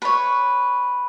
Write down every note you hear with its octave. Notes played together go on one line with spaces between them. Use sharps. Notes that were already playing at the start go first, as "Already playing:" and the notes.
B4 C#5